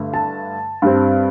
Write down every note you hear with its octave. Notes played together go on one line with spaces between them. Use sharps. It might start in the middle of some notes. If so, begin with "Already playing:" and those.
Already playing: G2 D3 A3 D4
A5
G2 G3 C4